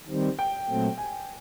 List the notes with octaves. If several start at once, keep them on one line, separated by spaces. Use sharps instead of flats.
D#3 G3 C4
G5
A#2 F#3 A3 C4
G#5